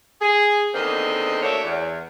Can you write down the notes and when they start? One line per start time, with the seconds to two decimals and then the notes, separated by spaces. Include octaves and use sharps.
0.21 G#4
0.74 E2 D3 D#3 A#3 C4 D#5
1.43 A3 A#3 D4 F#4 C#5 E5
1.64 E2